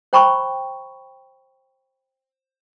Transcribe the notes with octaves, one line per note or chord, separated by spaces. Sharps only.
C5 G5 A#5 B5 C#6